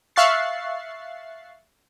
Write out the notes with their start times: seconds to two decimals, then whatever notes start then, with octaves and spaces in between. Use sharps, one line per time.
0.16 E5 F5 C#6 F#6 A6 C7